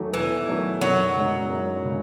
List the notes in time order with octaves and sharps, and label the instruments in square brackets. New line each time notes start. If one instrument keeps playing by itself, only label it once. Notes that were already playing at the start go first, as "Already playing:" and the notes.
Already playing: [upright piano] E2 D#3 F#3 A3
[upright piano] E2 [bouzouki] E3
[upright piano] D#3 F#3 A3
[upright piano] F#2 [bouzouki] F#3
[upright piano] C#3 G#3 D#4
F#2
C#3 G#3